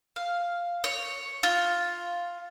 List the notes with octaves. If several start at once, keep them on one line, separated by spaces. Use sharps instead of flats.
F5
C#5
F4